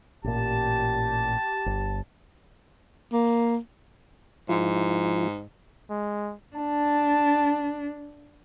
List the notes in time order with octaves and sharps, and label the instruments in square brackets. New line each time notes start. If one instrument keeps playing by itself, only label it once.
[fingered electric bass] A1 A#2 [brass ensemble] G4 A5
[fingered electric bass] G1
[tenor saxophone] A#3
[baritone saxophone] G#2 [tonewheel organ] F3 E4 F4
[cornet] G#3
[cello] D4 [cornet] A5